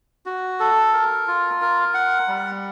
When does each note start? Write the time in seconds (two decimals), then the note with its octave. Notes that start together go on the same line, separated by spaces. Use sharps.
0.26 F#4
0.60 A4
0.93 A#4
1.27 F4
1.62 A#4
1.94 F#5
2.28 G3